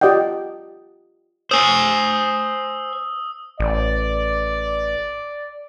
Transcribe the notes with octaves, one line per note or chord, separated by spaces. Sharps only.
F4 G4 D5 D#5 F#5 G5
C5 G#5 D#6 E6
A1 D5